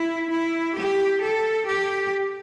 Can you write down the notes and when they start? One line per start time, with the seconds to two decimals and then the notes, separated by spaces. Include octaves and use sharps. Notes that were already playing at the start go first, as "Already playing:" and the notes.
Already playing: E4
0.32 E4
0.77 G4
1.24 A4
1.69 G4